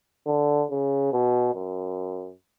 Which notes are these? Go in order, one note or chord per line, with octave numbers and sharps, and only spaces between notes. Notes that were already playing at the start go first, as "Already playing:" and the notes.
D3
C#3
B2
F#2